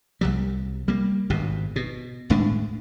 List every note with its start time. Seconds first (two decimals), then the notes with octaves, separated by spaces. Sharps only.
0.21 C2 F#3 G3
0.88 G3 A#3
1.30 G#1 G2 B2
1.76 B2
2.30 D#1 A2 G#3 D4